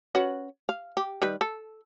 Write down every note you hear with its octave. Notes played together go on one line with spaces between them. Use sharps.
C#4 F#4 B4
F5
G4
D#3 G3 B4
A4